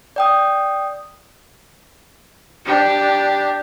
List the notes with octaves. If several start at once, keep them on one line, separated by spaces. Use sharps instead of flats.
D5 G5 D#6
D4 G4